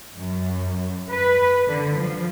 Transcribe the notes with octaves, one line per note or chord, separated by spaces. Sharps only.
F#2
B4
D3
F3